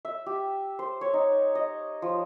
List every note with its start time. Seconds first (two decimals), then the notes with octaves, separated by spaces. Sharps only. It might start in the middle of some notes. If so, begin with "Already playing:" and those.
0.05 E5
0.26 G4
0.79 C5
1.01 C#5
1.13 D#4
1.55 D#5
2.02 F3